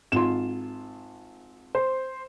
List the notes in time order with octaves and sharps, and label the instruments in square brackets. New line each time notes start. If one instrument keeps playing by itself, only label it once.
[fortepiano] G#1 F4 C6 [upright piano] E7
[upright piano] C5